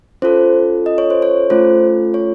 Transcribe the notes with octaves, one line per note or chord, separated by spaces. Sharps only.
C#4 F4 A4 C5
D#5
C#5
C5
C#5
A3 C#4 F4 A4 C5
C#5